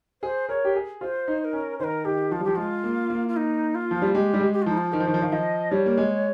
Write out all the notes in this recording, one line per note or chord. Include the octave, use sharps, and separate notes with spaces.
G#4 C5
A#4 C#5
G4
G#4
F4 C5
D#4
C5
A#4
C#4
D#3 A#4 C5
D#3 G4
F3 F4
G3
F3 G4
G#3 F4
A#3
A#3
F4
D#4
F4
F3
G3
G#3 G4
G3
G#3
G4
F4
F3 D#4
F4
D#3 C5
F3
D#3
F3
D#3 F5
F3 D#5
G3 C#5
A#3
G#3